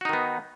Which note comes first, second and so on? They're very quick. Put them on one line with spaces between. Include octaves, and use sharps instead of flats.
F#4 D#4 D#3 B3